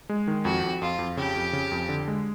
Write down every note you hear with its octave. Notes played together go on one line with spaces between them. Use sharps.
G#3
D#3
F2 F#4
F2
F2 F4
F2
C#3 G4
F2
C#3
F2
D3
G#3